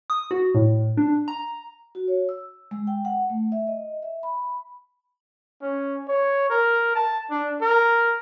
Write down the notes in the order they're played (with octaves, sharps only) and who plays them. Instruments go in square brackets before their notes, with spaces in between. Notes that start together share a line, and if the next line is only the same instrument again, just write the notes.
[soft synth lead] D#6
F#4
A2
D4
A#5
[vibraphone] F#4
C#5
E6
G#3
G5
F#5
A3
E5
D#5
E5
B5
[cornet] C#4
C#5
A#4
A5
D4
A#4